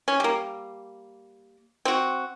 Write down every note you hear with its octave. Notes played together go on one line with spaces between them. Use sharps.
C#4
G3 A#3
C4 F#4